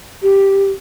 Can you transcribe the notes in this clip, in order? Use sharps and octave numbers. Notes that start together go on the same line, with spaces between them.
G4